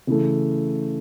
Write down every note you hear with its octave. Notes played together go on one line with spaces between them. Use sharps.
C#3 E3 A3